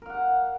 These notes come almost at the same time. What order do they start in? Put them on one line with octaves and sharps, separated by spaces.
A#4 F5 F#5